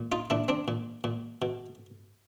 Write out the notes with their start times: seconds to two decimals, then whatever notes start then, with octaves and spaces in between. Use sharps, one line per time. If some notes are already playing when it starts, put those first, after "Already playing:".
Already playing: A#2
0.12 D#4 F4
0.30 A#2 D4 E4
0.48 C4 D4
0.68 A#2
1.04 A#2
1.42 B2